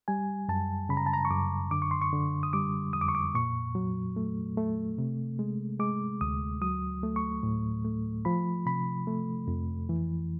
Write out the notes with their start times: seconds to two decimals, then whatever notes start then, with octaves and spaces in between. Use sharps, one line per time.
0.08 G3 G#5
0.49 F#2 A5
0.89 C#3 B5
0.97 A#5
1.06 A5
1.13 A#5
1.25 C#6
1.30 F#2 D6
1.71 D3 D6
1.82 C#6
1.91 C6
2.02 C#6
2.13 D3
2.43 D#6
2.53 G3 D6
2.93 F2 D#6
3.01 D6
3.09 C#6
3.15 D6
3.35 A#2 C#6
3.75 F#3
4.16 A3
4.57 A3
4.98 C3
5.39 G#3
5.80 G#3 D6
6.21 D2 D#6
6.62 F#3 D#6
7.03 A3
7.16 C#6
7.43 A2
7.85 A3
8.25 F3 B5
8.66 C3 B5
9.07 A3
9.48 F2
9.89 E3